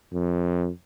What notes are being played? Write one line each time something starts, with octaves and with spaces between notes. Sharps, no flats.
F2